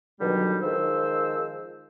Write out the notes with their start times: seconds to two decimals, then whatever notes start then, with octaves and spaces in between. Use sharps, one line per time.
0.21 B2 D3 D#3 F#3 G3
0.63 D#3 F3 G#3 C5 E6